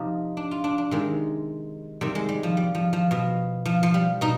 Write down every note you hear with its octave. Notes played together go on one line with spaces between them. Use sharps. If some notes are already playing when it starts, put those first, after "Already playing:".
Already playing: C3 F3 D#4
D4
F4
D4
D4
C3 D#3 G#3
C3 D#3 G3
G#3
G3
F3
G3
F3
F3
B2 F3
F3
F3
G3
B2 D#4